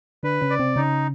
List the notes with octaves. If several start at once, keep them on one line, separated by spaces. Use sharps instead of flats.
D3 D4 B4
C#3 C#4
D5
C3 C4
C#3 C#4 D#4